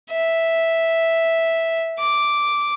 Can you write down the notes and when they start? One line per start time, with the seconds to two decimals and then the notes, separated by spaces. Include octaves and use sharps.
0.12 E5
1.99 D6